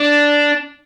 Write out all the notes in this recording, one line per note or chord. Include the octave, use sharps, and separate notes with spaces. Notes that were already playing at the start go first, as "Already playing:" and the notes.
Already playing: D4